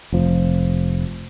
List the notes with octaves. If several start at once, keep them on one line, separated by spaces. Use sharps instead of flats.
F1 F3